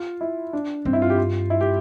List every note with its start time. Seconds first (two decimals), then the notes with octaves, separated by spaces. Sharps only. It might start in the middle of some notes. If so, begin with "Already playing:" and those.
Already playing: F4
0.21 E4
0.53 D4
0.85 G2 C4
0.93 E4
1.02 F4
1.10 G4
1.18 F4
1.50 E4
1.61 G4